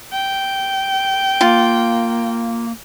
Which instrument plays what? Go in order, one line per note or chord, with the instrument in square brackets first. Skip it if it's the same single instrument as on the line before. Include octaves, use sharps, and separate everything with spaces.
[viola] G5
[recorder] A#3 [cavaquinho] F4